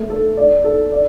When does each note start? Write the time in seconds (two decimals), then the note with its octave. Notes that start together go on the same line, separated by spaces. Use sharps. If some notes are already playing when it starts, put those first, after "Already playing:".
Already playing: A3
0.10 A4
0.37 D5
0.64 A4
0.92 D5